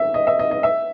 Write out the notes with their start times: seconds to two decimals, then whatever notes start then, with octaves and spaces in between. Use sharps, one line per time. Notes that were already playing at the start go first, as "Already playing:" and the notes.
Already playing: E5
0.14 D#5
0.27 E5
0.39 D#5
0.51 D#5
0.63 E5